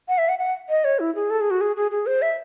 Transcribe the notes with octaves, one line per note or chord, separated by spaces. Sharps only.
F#5
E5
F#5
F#5
D#5
C#5
E4
G#4
A4
G#4
F#4
G#4
G#4
G#4
C5
E5